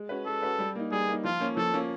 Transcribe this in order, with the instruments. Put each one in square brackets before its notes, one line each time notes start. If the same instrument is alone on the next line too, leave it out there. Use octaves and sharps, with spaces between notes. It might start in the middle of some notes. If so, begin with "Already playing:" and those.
Already playing: [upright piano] G#3
C#4 F#4 B4
[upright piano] G#3 [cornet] A4
[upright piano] C#4 F#4 B4
G3
A#3 D#4
[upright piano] G3 [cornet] G#4
[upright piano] A#3
D#4
[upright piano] F3 [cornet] F4
[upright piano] A#3 C#4
[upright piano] F3 [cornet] A4
[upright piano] A#3 C#4